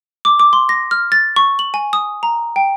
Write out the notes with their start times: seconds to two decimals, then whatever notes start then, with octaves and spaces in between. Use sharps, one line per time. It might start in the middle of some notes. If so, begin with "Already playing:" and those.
0.25 D6
0.40 D6
0.53 C6
0.69 A#6
0.91 F6
1.12 A6
1.36 C#6
1.59 F#7
1.74 G#5
1.93 D#6
2.23 A#5
2.56 G5